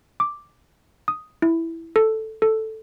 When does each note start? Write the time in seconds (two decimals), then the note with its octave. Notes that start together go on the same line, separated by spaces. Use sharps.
0.20 D6
1.08 D#6
1.42 E4
1.96 A4
2.42 A4